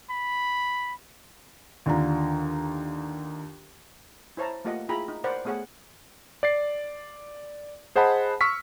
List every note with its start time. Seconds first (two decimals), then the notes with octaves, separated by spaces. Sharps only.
0.10 B5
1.86 D#2 D3 F4 A#5
4.37 E4 C5 C#5 A5 A#5
4.65 A3 A#3 F4 G4 D#5 F#5
4.89 E4 F4 G#4 G5 A#5 B5
5.08 D#4
5.24 A#4 C5 D5 F#5 B5
5.45 A3 B3 G#4 C#5 F#5
6.43 D5 A6 C7
7.96 G#4 C5 D#5 F#5 A5 B5
8.41 C#6 E6 F6 B6